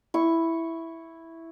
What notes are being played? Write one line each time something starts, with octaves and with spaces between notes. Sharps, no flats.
E4 C#6